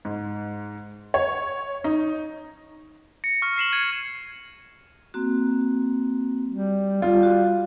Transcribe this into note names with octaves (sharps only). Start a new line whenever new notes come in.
G#2
C#5
D#4
A#6 C#7
C#6 F6
F6 C7 E7 F#7
G#6 C#7 D#7 F#7
A#3 C4 F#4
G3
G3 F4
F#4